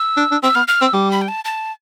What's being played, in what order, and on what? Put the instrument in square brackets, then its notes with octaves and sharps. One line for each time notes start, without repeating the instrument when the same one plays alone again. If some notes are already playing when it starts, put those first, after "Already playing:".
Already playing: [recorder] E6
[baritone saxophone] D4
D4
[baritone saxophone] C4 [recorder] E6
[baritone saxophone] B3 [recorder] F6
[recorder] F6
[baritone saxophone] C4 [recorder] E6
[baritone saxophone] G3 [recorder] D6
[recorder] B5
G5
A5
A5